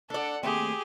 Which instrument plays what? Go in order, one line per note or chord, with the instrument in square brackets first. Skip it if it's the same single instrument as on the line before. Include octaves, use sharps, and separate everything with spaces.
[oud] D4 D5 [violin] A4 F#5
[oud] D#2 A3 C4 [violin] G4 [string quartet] G#4